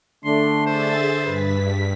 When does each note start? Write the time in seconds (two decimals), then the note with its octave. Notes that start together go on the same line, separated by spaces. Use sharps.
0.25 D3 A3 D4 C6
0.66 G#4 C5 E5 A6
1.25 G2 B4 B6